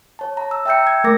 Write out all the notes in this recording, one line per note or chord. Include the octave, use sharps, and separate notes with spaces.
C#5 A5
A#5
E6
E5 G5 A#5 E6 G6 C#7
G#6
A3 A#4 D6 A#6